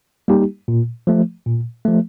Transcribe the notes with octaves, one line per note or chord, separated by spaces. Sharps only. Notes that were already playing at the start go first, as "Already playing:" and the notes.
G3 A#3 D#4 G4
A#2
F3 A3
A#2
F3 A3